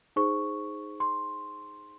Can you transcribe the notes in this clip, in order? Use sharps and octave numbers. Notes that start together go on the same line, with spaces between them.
D#4 G#4 C5 C#6
C6